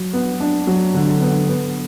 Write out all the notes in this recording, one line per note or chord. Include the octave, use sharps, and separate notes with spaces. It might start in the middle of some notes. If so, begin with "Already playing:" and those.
Already playing: F#3
B3
D4
F#3
D3
B3
B3